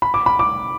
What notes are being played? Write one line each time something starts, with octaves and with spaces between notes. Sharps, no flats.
B5
D6
B5
D6